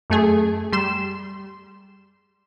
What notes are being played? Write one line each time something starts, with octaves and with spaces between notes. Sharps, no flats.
F#2 A3 G#4
G3 C6 E7